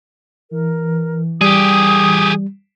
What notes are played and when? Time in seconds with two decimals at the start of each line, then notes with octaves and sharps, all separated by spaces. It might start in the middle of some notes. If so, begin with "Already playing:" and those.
0.51 E3 A#4
1.41 G3 G4 G#4 D#6